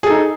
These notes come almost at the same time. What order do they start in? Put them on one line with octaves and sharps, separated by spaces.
G#4 A4 D#4